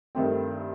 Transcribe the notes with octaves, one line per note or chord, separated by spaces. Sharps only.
G2 D#3 A3 C4